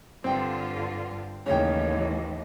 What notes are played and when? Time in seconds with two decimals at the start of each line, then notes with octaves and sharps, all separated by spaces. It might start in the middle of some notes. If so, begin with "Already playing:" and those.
0.24 G2 D3 C4 F4 G5
1.46 D#2 A2 C#3 E3 C#5 G5